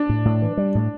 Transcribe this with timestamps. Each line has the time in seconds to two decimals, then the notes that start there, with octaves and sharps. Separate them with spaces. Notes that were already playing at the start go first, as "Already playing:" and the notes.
Already playing: D4
0.09 A2
0.25 A2
0.42 E3
0.57 G3
0.75 A2